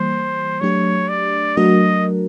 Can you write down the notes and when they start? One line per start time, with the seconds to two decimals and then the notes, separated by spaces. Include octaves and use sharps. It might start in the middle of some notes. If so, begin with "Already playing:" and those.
Already playing: E3 G3 A#3 C5
0.61 F#3 A3 D4 G4 C#5
1.09 D5
1.57 F#3 A3 D4 F#4 A#4 D#5